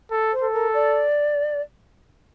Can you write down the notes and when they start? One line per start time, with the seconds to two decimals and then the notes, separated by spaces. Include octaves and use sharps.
0.11 A4
0.32 C5
0.42 A4
0.53 A#4
0.73 D5